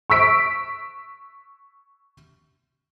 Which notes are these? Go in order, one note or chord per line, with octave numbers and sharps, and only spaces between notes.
C#6 E6 B6 D7